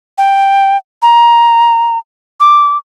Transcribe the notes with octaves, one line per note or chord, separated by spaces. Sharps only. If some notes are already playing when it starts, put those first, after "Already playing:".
G5
A#5
D6